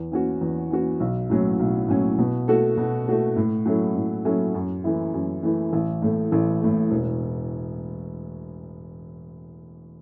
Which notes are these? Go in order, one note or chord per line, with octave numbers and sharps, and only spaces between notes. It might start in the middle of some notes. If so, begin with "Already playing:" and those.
Already playing: E2
E3 C#4 F#4
E2
E3 C#4 F#4
B1
A2 F#3 C#4
B1
A2 F#3 C#4
B2
A3 F#4 A4
B2
A3 F#4 A4
A2
F#3 C#4 E4 A4
A2
F#3 C#4 E4 A4
F#2
E3 A3 E4
F#2
E3 A3 E4
A1
A2 A3
A1
A2 A3
E1